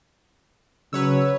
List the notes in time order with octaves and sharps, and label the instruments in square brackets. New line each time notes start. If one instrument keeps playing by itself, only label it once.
[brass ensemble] C#3 F#3 C#4 [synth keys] B4 C#5 E6